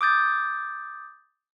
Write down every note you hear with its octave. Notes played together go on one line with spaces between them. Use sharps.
D6 D#6 G6 A6